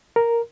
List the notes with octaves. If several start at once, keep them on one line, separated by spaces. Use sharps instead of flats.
A#4